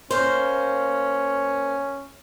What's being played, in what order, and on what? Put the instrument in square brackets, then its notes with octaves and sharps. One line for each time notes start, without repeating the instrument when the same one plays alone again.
[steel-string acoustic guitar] A#3 C5 [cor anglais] C#4